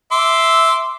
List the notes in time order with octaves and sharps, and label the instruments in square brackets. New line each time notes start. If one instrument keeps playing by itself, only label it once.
[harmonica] E5 C6 D6